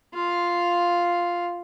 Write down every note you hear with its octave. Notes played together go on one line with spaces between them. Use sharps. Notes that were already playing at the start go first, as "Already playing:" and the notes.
F4 F5